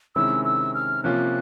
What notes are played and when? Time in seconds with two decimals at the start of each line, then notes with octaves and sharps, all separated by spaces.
0.16 C3 D#3 G#3 C#4 E4 E6
0.45 E6
0.74 F6
1.04 C3 F3 A#3 C#4 F4 F#6